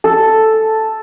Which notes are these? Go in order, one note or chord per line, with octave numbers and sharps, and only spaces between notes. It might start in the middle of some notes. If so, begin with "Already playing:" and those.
A4